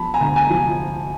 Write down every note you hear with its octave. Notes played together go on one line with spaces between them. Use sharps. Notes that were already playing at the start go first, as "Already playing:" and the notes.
Already playing: F3 A5 B5
G#5 A#5
D2
G#5 A#5
F3